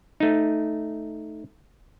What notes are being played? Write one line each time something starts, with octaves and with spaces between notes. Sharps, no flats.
A3 D#4